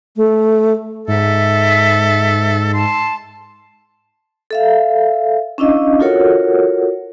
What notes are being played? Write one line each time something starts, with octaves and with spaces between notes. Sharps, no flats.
A3
G#2 A4 E5
A5 C6
A4 E5 F5
C#4 D4 E4 D#5 F5
F4 F#4 A4 A#4 C#5 F#5